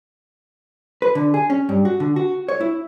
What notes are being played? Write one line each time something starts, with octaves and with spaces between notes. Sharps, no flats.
B4
D3
G#4
C#4
G2
F#4
D3
F#4
C#5
E4